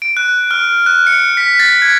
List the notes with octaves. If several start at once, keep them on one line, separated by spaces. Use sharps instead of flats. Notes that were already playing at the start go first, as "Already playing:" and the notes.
D7
F#6
F6
F#6
C#7
B6
A6
G#6